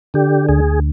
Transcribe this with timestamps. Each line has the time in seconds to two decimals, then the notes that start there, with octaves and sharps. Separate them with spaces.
0.14 D3 G4
0.49 D2 G#4